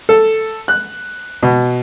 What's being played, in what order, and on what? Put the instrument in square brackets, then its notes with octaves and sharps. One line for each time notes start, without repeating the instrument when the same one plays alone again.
[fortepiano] A4
F#6
B2